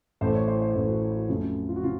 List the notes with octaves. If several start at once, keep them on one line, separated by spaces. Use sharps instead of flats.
A1 A2 A3 C5
C#5
C5
C5
A1 A2 A3 A4
F#4
F#4
F#4
F2 C#3 F#3 A3 F4
C#4
F4
F#4
C#3 F4